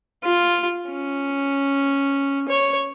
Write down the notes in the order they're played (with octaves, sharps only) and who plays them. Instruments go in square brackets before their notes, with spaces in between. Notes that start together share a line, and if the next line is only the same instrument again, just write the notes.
[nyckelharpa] F4
C#4
C#5